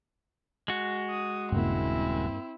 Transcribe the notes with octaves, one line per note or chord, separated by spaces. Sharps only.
G#3 F#4
D#6
D#1 G2 C#3 A#3 C4 E4